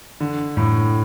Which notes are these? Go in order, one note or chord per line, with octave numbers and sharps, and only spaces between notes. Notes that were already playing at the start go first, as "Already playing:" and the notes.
D3
A2